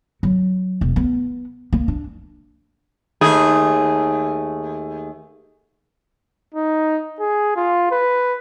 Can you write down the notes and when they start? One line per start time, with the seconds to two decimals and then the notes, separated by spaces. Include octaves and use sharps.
0.23 F#3
0.81 E1
0.96 B3
1.73 A#3
1.88 D4
3.21 D#2 A3 G#4
6.54 D#4
7.20 G#4
7.56 F4
7.91 B4